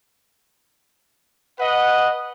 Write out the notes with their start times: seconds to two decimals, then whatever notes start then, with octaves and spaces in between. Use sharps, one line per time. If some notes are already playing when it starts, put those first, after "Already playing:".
1.60 B4 D#5 F#5